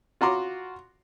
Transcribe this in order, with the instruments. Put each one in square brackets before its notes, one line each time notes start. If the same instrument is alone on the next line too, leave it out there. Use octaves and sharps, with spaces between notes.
[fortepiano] F4 F#4 A#5 C6 D6